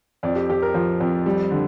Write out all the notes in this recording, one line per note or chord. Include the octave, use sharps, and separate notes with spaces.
F2 D5
G4
F2 G4
A#4
F3
F2
G3
D3